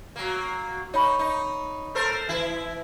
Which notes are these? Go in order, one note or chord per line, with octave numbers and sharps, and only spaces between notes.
F#3 A#3
D#4 C#5 B5 C#6
D#4
A4 A#4 C5
E3 E4